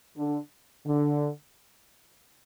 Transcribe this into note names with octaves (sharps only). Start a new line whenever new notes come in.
D3
D3